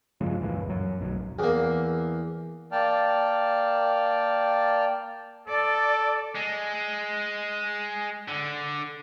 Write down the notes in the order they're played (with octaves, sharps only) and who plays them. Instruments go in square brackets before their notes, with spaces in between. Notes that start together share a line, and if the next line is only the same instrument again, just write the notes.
[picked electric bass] G2 C#3 F3 G#3
C#2 F#2 A#2 E3
F#2 F#3
D1 B1 F#3
[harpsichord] E2 A#3
[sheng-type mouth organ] A#3 D5 G5 A5 F6
[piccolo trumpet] A4 [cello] D5
[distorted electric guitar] G#3
D3